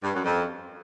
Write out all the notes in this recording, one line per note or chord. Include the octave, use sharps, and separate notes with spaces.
G2
F#2
F2